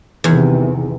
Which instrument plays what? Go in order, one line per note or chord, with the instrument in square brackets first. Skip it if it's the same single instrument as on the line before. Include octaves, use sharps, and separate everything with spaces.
[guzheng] E2 [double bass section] C3 D#3